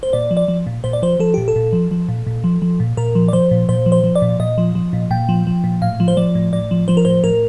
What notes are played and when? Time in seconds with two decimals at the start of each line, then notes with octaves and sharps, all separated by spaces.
0.03 C5
0.13 A#2 D5
0.31 F3
0.37 D5
0.48 F3
0.67 A#2
0.84 A#2 C5
0.93 D5
1.02 F3 C5
1.20 F3 A4
1.34 A#2 G4
1.48 A4
1.56 A#2
1.73 F3
1.91 F3
2.09 A#2
2.27 A#2
2.44 F3
2.62 F3
2.80 A#2
2.97 A#2 A#4
3.15 F3
3.28 D5
3.33 F3 C5
3.51 A#2
3.69 A#2 C5
3.86 F3
3.92 C5
4.04 F3
4.15 D5
4.22 A#2
4.40 A#2 D#5
4.58 F3
4.75 F3
4.93 A#2
5.11 A#2 G5
5.29 F3
5.47 F3
5.64 A#2
5.82 A2 F5
6.00 F3
6.08 C5
6.17 F3 D5
6.35 A2
6.53 A2 D5
6.71 F3
6.88 F3 C5
6.97 A#4
7.05 A2 C5
7.24 A2 A#4